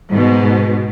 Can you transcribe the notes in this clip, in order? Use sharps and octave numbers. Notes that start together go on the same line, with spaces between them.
G#2 B2